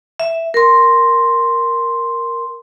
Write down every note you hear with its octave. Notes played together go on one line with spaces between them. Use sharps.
E5
A#4 C6